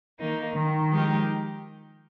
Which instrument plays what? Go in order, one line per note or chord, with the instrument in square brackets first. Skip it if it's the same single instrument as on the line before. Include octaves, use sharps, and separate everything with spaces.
[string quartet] D#3 A#3 D#4
[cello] D#3
[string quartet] F3 G#3 D#4 G4 A#4